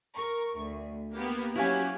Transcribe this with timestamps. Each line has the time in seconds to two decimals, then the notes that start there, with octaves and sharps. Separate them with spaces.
0.15 A#4 C#6
0.59 D2
1.15 A#3 B3 G4
1.55 F#3 C#4 E4 F#4 G4 F5 G#5